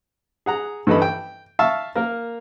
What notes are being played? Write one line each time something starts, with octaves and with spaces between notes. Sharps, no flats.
G#4 F#5 A#5
G2 E3 A4 D#5 B5
G5
E5 F5 A5 C#6
A#3 A#4